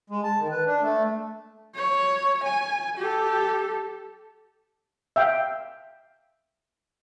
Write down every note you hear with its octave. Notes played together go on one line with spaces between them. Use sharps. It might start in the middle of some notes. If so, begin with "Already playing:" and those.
G#3
A5
D#3
B4
D4
A3
C#5
G#5
G4 A4
E5 F5 G5